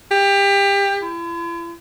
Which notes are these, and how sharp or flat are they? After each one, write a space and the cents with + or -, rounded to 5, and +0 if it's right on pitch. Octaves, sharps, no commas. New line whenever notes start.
G4 +25
E4 +45